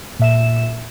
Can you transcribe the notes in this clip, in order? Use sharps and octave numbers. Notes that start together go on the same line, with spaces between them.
A#2 E5 E7